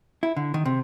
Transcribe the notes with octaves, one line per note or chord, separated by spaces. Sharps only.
E4
D3
D#3
C3